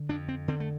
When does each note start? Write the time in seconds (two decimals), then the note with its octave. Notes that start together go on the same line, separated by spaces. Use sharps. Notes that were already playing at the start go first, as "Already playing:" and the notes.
Already playing: D3
0.09 F2 D4
0.28 C4
0.48 D3 C4
0.60 A3